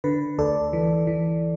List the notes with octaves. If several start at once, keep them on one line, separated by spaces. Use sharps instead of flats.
D3 B4
D2 A4 D5
E3
E3